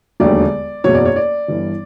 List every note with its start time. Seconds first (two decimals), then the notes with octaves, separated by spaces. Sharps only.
0.20 E1 D#2 D3 F#3 A3 D5
0.84 F#1 E2 B2 F#3 C#5
0.94 D5
1.05 C#5
1.16 D5
1.48 G1 G2 E3